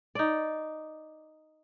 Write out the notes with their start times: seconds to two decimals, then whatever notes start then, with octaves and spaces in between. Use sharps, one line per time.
0.15 D#4 D5